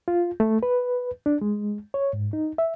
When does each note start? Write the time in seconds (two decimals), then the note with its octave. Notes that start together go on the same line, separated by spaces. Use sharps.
0.08 F4
0.40 A3
0.63 B4
1.26 D4
1.41 G#3
1.94 C#5
2.13 G#2
2.33 D#4
2.58 E5